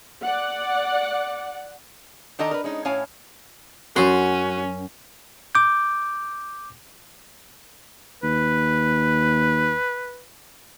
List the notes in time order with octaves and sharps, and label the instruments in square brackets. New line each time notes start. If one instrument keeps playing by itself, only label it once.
[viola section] D5 F#5
[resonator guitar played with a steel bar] D#3 D4 A4 D#5 A#5
A#4 B4
G#3 C#4 D#4
A2 C#4 E4 C#5 F5 G#5
[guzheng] F#2 C6 [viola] C#4 [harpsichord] F#4
[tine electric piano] D6 G6
[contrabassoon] D#2 [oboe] B4